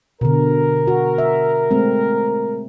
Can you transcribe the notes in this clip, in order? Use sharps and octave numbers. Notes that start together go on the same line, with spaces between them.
B2 D3 A#4
F#4
E5
G#3 A3 C4